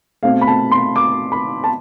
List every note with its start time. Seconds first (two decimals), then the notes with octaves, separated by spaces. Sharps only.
0.23 B2 A3 C4 F5
0.41 B5
0.47 A5
0.71 C6
0.96 D6
1.32 B5
1.64 A5